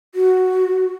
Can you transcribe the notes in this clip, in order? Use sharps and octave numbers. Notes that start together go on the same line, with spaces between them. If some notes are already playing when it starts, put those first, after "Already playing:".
F#4